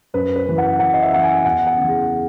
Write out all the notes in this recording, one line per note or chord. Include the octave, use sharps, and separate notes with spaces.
F#2 B4
B4
C#3 E3
F#5
F#2 F#5
D#5
E5
C#3 E3 F#5
G#5
E2 F#5
F#5
C#3 E3
G#4